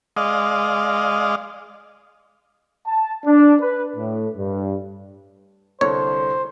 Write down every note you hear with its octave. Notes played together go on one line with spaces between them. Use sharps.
G#3 D5 D#5 F5
A5
D4
B4
A2
G2
C2 D3 C5 C#5